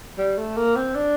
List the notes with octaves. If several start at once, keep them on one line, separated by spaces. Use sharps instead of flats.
G3
A3
A#3
C4
D4